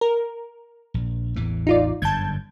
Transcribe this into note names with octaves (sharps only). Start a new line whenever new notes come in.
A#4
A#1
A1 E2 E3
D#4 F4 D5
G1 F#2 D3 A5 G6 G#6